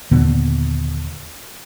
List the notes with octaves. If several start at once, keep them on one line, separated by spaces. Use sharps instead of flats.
D#2 A#2 D3 B3